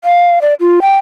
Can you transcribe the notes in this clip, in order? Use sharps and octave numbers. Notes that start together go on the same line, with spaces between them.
F5
D5
F4
G5